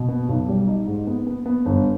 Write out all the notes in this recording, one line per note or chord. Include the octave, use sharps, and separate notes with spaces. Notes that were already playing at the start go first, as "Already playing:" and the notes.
Already playing: B2
B3
B1
G3
D#4
G#2
B3
B3
B3
G1